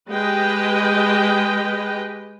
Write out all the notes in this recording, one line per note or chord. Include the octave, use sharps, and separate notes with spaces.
G#3 G4 B4 D#5 G5